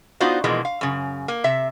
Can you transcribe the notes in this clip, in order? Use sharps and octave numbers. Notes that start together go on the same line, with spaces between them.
B3 D4 D#4 F4 F#4 C5
B2 E3 F3 G#3 A#3
F5
F#2 C#3
A#3
C3 E5